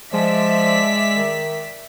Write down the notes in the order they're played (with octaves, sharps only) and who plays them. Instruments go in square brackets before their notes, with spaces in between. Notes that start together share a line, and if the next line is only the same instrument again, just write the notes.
[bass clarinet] F3 [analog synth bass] G#3 [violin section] D5 E5 B6
[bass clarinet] D#3